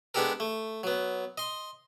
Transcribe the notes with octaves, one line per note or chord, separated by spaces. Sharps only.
G#3 B3 D4 G4 A4 A#4
A3
F#3 B3
D#5 C6